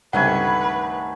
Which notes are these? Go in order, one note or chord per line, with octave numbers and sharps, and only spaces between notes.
C#2 G2 C3 D#3 A3 B4 F#5 G#5